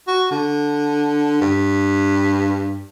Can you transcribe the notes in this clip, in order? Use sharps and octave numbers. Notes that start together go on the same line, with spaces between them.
F#4
D3
G2